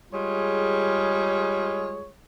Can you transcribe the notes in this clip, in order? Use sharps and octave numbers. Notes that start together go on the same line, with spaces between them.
G3 G#3 F4 G#4 C#5